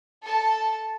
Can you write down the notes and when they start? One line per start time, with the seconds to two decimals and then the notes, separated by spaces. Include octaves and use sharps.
0.22 A4 A5